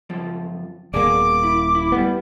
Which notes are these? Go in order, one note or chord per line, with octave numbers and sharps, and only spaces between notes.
C#2 F#2 F3
D#1 B2 A#3 G#4 D5 D6
E4
E4
G3 A3 B3